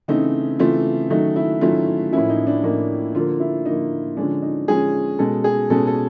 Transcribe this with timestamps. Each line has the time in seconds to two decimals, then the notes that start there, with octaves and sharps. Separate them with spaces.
0.08 C#3 E3 A3 C4 D#4
0.59 C#3 E3 A3 C4 F4
1.10 D#3 F#3 A3 C#4 D#4
1.36 E4
1.61 D#3 F#3 A3 C#4 F4
2.12 A2 F3 A#3 C#4 E4
2.30 D#4
2.47 D4
2.63 A2 F3 A#3 C#4 D#4
3.15 D3 F3 A#3 F4
3.40 E4
3.66 D3 F3 A#3 D#4
4.17 D3 F3 G#3 C#4 D4
4.42 D#4
4.67 D3 F3 G#3 C#4 G#4
5.19 B2 G#3 C#4 A4
5.44 G#4
5.70 B2 G#3 C#4 A4
5.87 A4